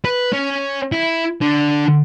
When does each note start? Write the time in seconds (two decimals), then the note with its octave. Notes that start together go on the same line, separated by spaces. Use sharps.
0.05 B4
0.33 C#4
0.92 E4
1.42 D3 D4